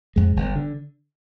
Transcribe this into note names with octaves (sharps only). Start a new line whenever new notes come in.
F2 G#3
G1
D3